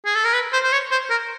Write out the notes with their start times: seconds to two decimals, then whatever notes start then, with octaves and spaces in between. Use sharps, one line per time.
0.05 G#4
0.15 A4
0.25 A#4
0.34 B4
0.53 C5
0.63 C5
0.72 C#5
0.91 C5
1.10 A#4